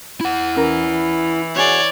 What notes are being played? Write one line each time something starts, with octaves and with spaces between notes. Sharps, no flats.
E4 F#5
E3 C#4 A#4
F#4 G#4 C#5 D5